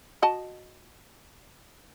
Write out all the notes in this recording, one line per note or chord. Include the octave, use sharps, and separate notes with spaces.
F#4 D#5 A5